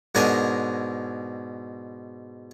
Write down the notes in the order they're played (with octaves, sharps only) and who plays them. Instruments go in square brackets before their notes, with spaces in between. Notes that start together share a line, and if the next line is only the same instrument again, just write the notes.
[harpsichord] G#2 B2 G#3 D4 A#4 G#5